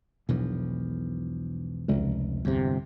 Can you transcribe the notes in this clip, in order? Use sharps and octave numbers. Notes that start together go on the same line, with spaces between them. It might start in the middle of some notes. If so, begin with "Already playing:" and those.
E1 B1 B2 E3 F3
F1 C#2
G1 E2 C3